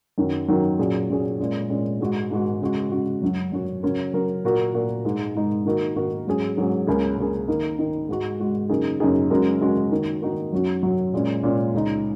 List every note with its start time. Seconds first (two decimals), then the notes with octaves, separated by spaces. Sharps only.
0.18 F#2 D#3 F#3
0.48 F#2 D#3 F#3
0.79 A#2 F#3 C#4 G#4
1.09 A#2 F#3 C#4 G#4
1.40 A#2 G#3 C#4
1.70 A#2 G#3 C#4
2.01 G#2 G#3 F#4
2.31 G#2 G#3 F#4
2.61 C#3 G#3 F#4
2.92 C#3 G#3 F#4
3.22 F#2 F#3 C#4 F#4
3.52 F#2 F#3 C#4 F#4
3.83 C#3 F#3 C#4 A#4
4.13 C#3 F#3 C#4 A#4
4.44 A#2 A#3 F#4 A#4
4.74 A#2 A#3 F#4 A#4
5.05 G#2 G#3 D#4
5.35 G#2 G#3 D#4
5.65 D#3 A#3 D#4 F#4 A#4
5.96 D#3 A#3 D#4 F#4 A#4
6.27 G#2 F#3 C#4 G#4
6.57 G#2 F#3 C#4 G#4
6.87 C#2 C#3 A#3 C#4 G#4
7.18 C#2 C#3 A#3 C#4 G#4
7.48 D#3 A#3 D#4
7.79 D#3 A#3 D#4
8.09 G#2 G#3 F#4
8.40 G#2 G#3 F#4
8.69 F#2 C#3 A#3 D#4 G#4
9.00 F#2 C#3 A#3 D#4 G#4
9.31 F#2 C#3 G#3 F#4 A#4
9.61 F#2 C#3 G#3 F#4 A#4
9.91 D#3 A#3 D#4 F#4 A#4
10.22 D#3 A#3 D#4 F#4 A#4
10.52 F#2 F#3 C#4 F#4
10.83 F#2 F#3 C#4 F#4
11.13 A#2 G#3 C#4
11.43 A#2 G#3 C#4
11.74 C#2 C#3 G#3 D#4